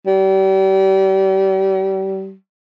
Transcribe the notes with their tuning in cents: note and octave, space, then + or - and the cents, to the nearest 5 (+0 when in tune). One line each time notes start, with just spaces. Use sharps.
G3 -35